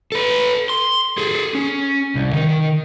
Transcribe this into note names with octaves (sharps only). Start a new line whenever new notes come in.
A4 B4
C6
G#4 A4
C#4
C2
D#3